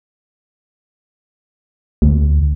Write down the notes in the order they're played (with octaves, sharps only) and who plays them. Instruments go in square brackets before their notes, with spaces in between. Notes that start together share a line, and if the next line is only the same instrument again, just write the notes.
[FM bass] D2